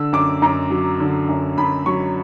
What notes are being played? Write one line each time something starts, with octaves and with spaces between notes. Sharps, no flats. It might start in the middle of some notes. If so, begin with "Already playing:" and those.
Already playing: D3 E6
F#2 D6
F#2 A#5
F#3
D3
F#2
F#2 B5
F#3 C#6